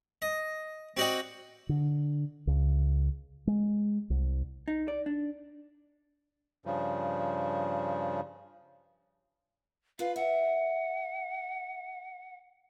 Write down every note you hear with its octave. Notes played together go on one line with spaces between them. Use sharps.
D#5
C4 F#4 D5 D#5 F#5 G5
D3
C#2
G#3
C2
D#4
D5
D4
G2 C#3 F3
F4 B4 F5
E5 F#5